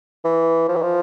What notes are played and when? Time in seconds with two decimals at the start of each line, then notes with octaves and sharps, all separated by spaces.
0.25 E3
0.69 F3
0.76 E3
0.83 F3